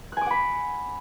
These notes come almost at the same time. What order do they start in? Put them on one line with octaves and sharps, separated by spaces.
F#6 G#5 D6 F#5 B5